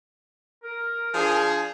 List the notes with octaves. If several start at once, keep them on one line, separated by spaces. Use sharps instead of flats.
A#4
F3 D4 G#4